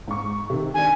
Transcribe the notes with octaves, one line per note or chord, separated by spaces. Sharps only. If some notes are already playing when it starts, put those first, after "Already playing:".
G#2 C#6
C3 D#3
D#3 D4 G#5